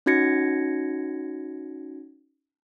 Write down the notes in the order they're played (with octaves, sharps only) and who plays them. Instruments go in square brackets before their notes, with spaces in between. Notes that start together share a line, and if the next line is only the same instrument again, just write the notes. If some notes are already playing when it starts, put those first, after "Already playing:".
[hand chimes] C#4 D#4 F#4 G#6 A#6 C#7